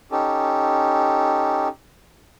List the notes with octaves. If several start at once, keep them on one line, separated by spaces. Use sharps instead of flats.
C#4 D#4 G4 A4